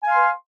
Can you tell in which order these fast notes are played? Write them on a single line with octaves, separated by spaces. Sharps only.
G#5 F5 C6 B4